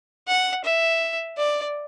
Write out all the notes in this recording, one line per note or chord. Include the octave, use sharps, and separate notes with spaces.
F#5
E5
D5